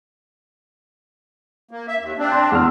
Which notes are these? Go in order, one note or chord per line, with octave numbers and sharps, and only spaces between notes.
A#3
E5
D#2
C4 D4
C6
E2 E6 F6